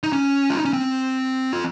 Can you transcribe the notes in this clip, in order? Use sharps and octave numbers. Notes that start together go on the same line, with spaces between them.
D#4
C#4
F4
D#4
C#4
C4
F4